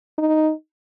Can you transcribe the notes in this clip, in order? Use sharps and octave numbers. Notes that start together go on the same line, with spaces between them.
D#4